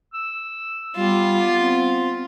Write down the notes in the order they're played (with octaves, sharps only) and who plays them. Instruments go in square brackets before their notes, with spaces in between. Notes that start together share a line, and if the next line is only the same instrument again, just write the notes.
[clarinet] E6
[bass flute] G3 [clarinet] B3 [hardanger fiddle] F4
[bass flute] C4